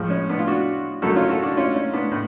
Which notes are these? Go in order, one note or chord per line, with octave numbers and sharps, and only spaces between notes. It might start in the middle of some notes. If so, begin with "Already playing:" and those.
Already playing: A2 F3 G#3
C#4
B3 D4
F4
D4 F#4
F#2 D3 F#3 A3 F#4 A4
C#4 F4
F#4 A4
D4 F#4
C#4 F4
C#4
B3 D4
A2